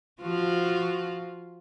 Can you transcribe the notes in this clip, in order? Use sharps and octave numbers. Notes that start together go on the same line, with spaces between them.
F3 F4 F#4